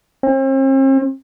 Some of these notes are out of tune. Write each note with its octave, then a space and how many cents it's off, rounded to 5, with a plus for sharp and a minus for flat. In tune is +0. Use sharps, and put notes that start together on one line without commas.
C4 +45